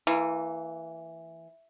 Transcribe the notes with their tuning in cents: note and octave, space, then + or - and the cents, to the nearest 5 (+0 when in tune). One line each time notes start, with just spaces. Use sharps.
E3 +0 A#3 -30